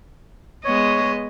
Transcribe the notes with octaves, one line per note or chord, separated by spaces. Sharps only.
G#3 B3 C#5 D#5